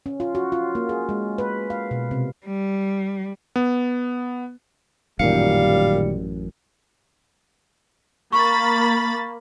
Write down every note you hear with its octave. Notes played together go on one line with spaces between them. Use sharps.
C#4
F4
F#4
F4
A#3
G#4
G#3
B4
F5
B2
C3
G3
B3
A1 F#2 A#2 D#3 G3 F5 C#7
A#3 B5 C#6 A6